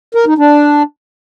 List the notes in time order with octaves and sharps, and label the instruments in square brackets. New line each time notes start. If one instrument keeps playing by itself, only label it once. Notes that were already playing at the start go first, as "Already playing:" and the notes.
[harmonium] A#4
D#4
D4